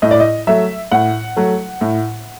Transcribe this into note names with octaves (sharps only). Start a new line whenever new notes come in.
A2 D#5
D5
D#5
F#3 A3 E5
A2 F#5
F#3 A3
A2